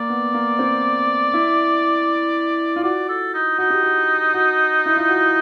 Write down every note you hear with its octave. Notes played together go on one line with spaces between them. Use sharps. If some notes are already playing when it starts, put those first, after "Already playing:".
Already playing: A#3 D5
B3
A#3
C4
E4
F4
F#4 D5
A4
D#4
D#4 F#4
G4
F#4
F#4
E4
F4
F#4